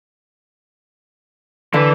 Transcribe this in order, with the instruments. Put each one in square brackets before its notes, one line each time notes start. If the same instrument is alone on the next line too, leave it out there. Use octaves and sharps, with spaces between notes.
[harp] D3 [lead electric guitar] E3 B4